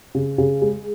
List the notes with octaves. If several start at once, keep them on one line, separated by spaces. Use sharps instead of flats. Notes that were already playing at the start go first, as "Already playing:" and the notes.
C#3
C#3
G#3